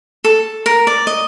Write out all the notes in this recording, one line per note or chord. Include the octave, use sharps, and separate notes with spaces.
A4
A#4
D5
D#5